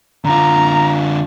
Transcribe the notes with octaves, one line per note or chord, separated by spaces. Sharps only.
D3 F4 A#5